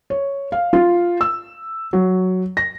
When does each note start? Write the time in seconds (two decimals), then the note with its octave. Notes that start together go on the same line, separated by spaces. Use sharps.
0.10 C#5
0.52 F5
0.73 F4
1.21 E6
1.93 F#3
2.57 A#6